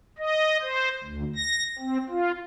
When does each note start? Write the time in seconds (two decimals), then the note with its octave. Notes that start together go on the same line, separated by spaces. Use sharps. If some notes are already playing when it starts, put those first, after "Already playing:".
0.18 D#5
0.62 C5
1.04 D2
1.36 A#6
1.79 C4
2.10 F4